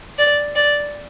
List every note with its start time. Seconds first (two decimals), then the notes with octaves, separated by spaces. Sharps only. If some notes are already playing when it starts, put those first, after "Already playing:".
0.18 D5
0.55 D5